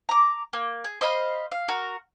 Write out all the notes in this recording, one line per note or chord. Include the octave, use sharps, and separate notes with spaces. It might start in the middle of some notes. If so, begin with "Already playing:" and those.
A#5 D6
A#3
G#4
C5 D#5 F5 B5
F5
F#4 A#4